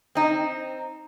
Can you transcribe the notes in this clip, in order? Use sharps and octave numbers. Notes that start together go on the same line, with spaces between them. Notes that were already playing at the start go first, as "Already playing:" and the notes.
C4 D#4